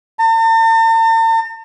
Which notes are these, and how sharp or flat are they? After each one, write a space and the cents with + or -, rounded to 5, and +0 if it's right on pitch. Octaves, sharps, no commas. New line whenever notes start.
A5 +45